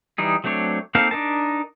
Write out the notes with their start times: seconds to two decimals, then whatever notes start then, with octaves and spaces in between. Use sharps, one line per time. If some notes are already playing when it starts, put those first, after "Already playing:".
0.18 E3 G3 D#4 G#4
0.44 F#3 A3 C4 D4 C#5
0.95 A#3 C4 D#4 A4 F5
1.11 D4 D#4 A#4 A5